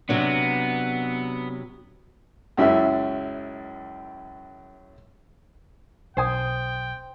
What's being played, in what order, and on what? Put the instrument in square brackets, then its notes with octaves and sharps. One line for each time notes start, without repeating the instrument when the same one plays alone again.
[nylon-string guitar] C3 F#3 D4 [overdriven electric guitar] B3
[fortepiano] C#2 F#2 E4 E5
[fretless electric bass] B1 [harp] C5 G#5 D#6 [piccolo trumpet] G5